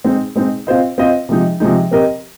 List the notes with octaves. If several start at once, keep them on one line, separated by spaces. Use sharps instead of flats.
G#3 C4 D#4
G#3 C4 D#4
C4 F4 C5 D#5
C4 F4 C5 D#5
C3 F3 G#3 D#4
C3 F3 G#3 D#4
C4 G4 A#4 D#5